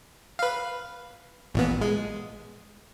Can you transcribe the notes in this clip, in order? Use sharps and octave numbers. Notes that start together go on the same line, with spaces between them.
B4 F5
A1 A#2 B3
G#3